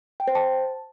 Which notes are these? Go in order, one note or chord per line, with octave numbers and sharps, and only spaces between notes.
G5
C5
A5